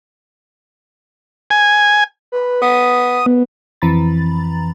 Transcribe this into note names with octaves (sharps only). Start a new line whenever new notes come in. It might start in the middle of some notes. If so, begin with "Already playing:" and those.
G#5
B4
B3 D#6
B3
F2 E3 C4 A#5 B5 A6